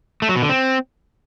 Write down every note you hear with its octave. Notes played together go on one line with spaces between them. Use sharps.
A3
F#3
B2
D3
C4